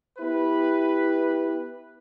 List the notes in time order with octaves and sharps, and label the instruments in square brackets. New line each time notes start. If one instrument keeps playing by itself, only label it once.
[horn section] B3 E4 G4 B4